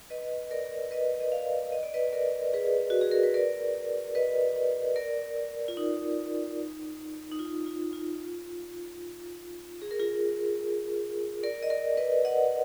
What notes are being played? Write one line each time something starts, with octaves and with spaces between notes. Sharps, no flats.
B4 D#5
A#4 D5
B4 D#5
D#5
D5 F5
D#5
D5
B4 D#5
A#4 D5
G#4 B4
F#4
G#4
A#4
B4
A#4 D5
B4 D#5
A#4 D5
F4
D#4
D#4
F4
F4
F4
G#4
A#4
F4 G#4
A#4 D5
D#5
A#4 D5
B4 D#5
D#5 F#5